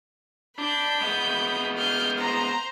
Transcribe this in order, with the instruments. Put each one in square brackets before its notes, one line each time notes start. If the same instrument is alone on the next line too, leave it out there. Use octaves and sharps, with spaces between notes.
[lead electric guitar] D4 [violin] B5 G6
[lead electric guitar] G#3 B3
[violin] F6 G6
C5 A#5